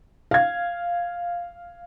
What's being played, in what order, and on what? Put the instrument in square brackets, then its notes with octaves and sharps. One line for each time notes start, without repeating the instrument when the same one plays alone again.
[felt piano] F5 G#6